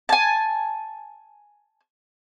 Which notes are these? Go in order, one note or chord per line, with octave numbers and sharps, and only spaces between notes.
G#5 A5